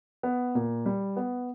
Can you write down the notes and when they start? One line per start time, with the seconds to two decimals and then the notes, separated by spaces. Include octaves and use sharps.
0.23 B3
0.55 A#2
0.86 G3
1.17 B3